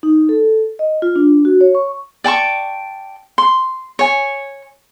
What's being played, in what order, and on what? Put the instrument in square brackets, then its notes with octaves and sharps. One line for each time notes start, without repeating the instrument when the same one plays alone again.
[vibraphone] D#4
A4
D#5
F4
D4
F#4
C#5
C#6
[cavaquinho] D5 G5 A5 C#6
C6
C#5 G#5